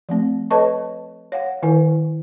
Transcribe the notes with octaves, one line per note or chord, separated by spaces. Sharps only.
F3 A3 C4
A4 B4 C#5 D#5 A5 C#6
C#5 F5 F#5
D#3 E4 A#4 G#5